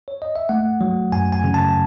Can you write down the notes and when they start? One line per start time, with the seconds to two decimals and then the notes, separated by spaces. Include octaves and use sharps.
0.08 C#5
0.22 D#5
0.36 E5
0.49 A3 F#5
0.81 F#3
1.12 F#2 G#5
1.32 G#5
1.44 C#3
1.54 A5